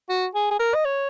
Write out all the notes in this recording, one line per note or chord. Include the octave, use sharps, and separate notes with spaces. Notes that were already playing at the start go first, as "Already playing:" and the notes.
F#4
G#4
G#4
A#4
D#5
C#5